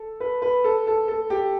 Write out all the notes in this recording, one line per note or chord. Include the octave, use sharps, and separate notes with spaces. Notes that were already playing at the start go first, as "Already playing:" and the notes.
Already playing: A4
B4
B4
A4
A4
A4
G4